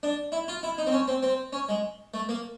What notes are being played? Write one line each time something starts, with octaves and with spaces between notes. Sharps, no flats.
D4
E4
F4
E4
D#4
C4
C#4
C4
C4
C#4
G#3
A3
A#3